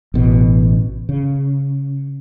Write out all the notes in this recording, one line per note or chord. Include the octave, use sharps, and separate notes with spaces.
A1 B2
C#3